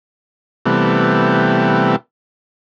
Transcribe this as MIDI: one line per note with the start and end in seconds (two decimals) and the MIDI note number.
0.66 1.96 48
0.66 1.96 52
0.66 1.96 55
0.66 1.96 57
0.66 1.96 59